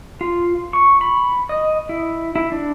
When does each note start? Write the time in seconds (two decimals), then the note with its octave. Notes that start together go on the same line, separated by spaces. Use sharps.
0.21 F4
0.73 C#6
1.01 B5
1.49 D#5
1.89 E4
2.36 E4
2.52 D4